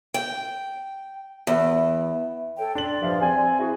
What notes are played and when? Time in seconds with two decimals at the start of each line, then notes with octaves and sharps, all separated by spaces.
0.14 G5
1.47 E2
2.58 A4 C#5 G5
2.75 D4 D5 C6 F#7
3.02 G2 A#2 F3 E5 F5
3.21 C4 G#5
3.59 E4 F#4 G#4